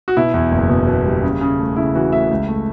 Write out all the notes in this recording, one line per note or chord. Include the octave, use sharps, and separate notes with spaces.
F#4
B2 E4
E2
F#1
B2
B2
G3
C#3
C#3
A3
C#3 E4
E3 F#4
A3 E5
C#2
A3